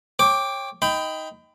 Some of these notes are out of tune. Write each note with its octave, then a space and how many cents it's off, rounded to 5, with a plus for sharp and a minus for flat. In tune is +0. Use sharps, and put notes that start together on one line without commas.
C#5 -25 G5 +15 D6 +0
D#4 +15 G5 +0 B5 +30